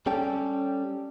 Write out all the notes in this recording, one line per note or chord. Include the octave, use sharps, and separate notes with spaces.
G3 C#4 A4 G5